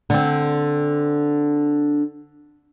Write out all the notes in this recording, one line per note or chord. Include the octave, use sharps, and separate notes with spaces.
D3 C4